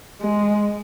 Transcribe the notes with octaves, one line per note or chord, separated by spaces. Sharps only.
G#3